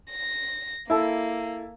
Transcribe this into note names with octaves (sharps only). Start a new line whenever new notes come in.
A#6
A#3 E4 A4